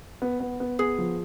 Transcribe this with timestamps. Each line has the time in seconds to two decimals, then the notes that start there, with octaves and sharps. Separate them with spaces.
0.22 B3
0.40 B3
0.60 B3
0.79 B3 G#4
0.98 F3